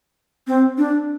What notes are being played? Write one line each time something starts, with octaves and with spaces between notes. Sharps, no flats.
C4
D4